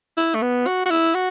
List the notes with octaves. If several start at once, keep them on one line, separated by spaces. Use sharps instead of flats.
E4
A3
B3
F#4
F#4
E4
F#4